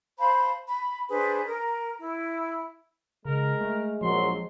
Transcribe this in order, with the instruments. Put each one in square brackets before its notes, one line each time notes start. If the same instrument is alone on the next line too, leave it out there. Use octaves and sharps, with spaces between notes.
[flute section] C5 F5 A5 B5
B5
D4 G#4 B4 C5
A#4 A#5
E4
[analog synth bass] C#3 [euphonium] G#3 [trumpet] A#4
[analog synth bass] A3
[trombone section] A#1 F#3 [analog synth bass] F3 [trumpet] C6